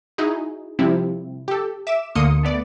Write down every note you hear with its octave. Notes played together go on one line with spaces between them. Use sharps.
D#4 E4 F#4 G#4
C3 F3 G3 C4 E4
G4 A4
E5 D6 E7
D2 D3 A#3 C6 D#6 C#7
A3 B3 D5